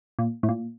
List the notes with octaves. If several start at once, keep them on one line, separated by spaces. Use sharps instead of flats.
A#2
A2
A#2